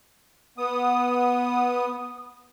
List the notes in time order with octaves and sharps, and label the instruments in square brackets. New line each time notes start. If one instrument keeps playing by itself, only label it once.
[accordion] B3 D#6